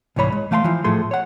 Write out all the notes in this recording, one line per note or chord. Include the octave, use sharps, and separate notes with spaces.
C2 G#2 E3 C#5 B5
G#3
E3 A3 F5 G5 C6
E3 F3
A2 F3 A3 G#4 C6
C#5 F#5